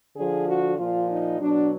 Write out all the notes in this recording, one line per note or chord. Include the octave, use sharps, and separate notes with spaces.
D3 F3 G#4
F#4
A#2 F3 F4
D#4
B2 F#3 D4